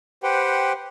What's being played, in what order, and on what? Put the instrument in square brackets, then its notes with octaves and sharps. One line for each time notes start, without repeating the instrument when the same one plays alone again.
[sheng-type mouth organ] G4 B4 C5 F#5 G5